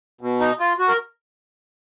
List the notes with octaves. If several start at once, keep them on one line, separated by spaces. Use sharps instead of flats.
B2
D#4
F4
F#4
A#4